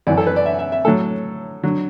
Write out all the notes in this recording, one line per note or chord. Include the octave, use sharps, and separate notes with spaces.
F#2 E3 D5
A4
B4
D5
E5
E5
E5
A2 F#3 A4
D3 F#3